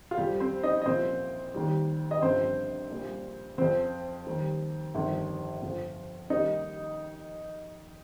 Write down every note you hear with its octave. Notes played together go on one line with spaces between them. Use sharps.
F4
F2 F3 G3 G4
C4 C5
D#4 D#5
D#5
C2 A#2 F3 C4 C5
D#2 D#3 G3
D#5
G1 G2 F3 C4 C5
A#1 A#2 G3
F2 F3 C4 C5
D#2 D#3 G3
G1 F2 C3 D#3 G3
G1 F2 F3
D#2 D#3 G3 D#4 D#5